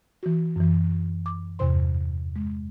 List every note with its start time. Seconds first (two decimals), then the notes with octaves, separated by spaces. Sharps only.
0.23 E3 F#4
0.56 F#2 E3
1.26 D6
1.59 E2 G2 C3 C5 C6
2.36 G#3